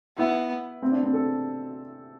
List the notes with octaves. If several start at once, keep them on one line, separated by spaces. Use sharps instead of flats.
B3 E4
C4
D4
C4
A4